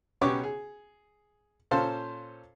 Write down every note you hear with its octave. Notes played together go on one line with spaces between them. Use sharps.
B1 B3 C#4 G4 C#5 D6
G#4
A#2 C#4 A4 C5 F5 A5